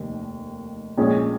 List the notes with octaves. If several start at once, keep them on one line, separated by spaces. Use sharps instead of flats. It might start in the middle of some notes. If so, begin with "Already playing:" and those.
Already playing: F1 D#2 D#3
A#1 A#2 G#3 C#4 G#4